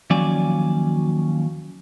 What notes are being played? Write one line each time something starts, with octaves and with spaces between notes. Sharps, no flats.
D#2 F3 F#3 C#4 D5 G#5